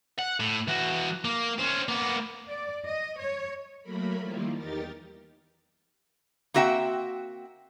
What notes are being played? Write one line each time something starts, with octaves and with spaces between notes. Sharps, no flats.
F#5
A2
E3 F#4
A#3
C#4 C5
A#3 B3
D5
D#5
C#5
F#3 A3 A#3 A#4 B5
D#3 F3 G3 A#3 E4 F4
E2 D#4 G4 A#4 A6
A#3 C4 F#4 E5 F#5 G5